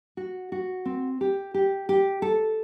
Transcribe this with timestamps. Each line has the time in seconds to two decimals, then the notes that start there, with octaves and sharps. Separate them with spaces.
0.17 F#4
0.52 F#4
0.85 C4
1.21 G4
1.54 G4
1.89 G4
2.22 A4